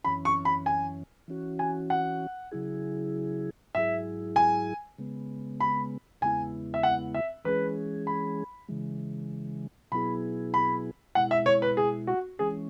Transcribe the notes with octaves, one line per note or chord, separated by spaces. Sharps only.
F#2 E3 C#4 B5
C#6
B5
G#5
E3 C#4 F#4
G#5
F#5
C#3 F#3 E4 G#4
G#2 F#3 E4 G#4 E5
G#5
C#3 G#3 B3
B5
E2 C#3 G#3 B3 E4 G#5
E5
F#5
E5
E3 G#3 C#4 G#4 B4
B5
C#3 E3 G#3
B2 F#3 B3 E4 G#4 B5
B5
B2 G#3 E4 F#5
E5
C#5
B4
G#4
F#4
E3 G#3 C#4 G#4